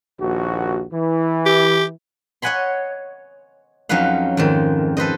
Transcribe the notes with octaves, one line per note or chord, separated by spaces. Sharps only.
A#1 D#2 F#4
E3
G4
C#5 D#5 F#5 G#5 B5 C6
F2 F#3 C#4 D#4 B4 F5
F2 G#2 D#3
A4 B4 C5 D#5